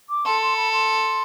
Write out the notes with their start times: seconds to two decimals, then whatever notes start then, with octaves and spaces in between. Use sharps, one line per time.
0.09 D6
0.25 A4 C6
0.41 C6
0.56 B5
0.72 C6